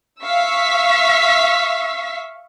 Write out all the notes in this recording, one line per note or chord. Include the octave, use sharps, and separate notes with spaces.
E5 F5 C#6 E6 B6